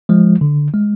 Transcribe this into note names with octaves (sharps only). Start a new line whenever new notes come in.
F3 G#3
D3
G#3